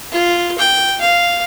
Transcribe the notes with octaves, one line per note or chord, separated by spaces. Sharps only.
F4
G5
F5